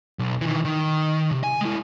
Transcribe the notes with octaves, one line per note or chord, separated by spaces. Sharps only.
B1
D#3 E3
D#3
C3
G#5
G#3 E4